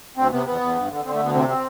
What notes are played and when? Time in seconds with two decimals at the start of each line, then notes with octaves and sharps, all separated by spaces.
0.17 D2 C4
0.32 C3 B3
0.46 E2 B3
0.61 E2
0.76 G2
0.90 D3
1.05 D3 C4
1.14 A3
1.19 D2 B3
1.34 C3 C4
1.48 C4